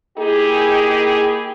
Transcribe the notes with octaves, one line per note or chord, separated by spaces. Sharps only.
A#3 D#4 E4 G4 G#4